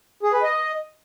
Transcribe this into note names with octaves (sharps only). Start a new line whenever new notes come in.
G#4
B4
D#5